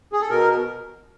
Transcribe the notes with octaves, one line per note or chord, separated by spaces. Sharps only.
G#4
A4
B2 A#4